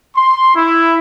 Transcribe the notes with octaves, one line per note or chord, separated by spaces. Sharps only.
C6
E4